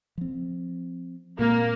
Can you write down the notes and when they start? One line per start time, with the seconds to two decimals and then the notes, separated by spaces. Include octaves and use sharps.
0.18 F3 C4
1.39 A#2 G#3 A#3 C4